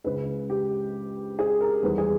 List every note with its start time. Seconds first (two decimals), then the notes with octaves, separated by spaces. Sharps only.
0.04 C#2 C#3 G#3 B4
0.50 G4
1.39 G#4
1.61 A#4
1.82 E2 D#3 G3 B4
1.98 G#4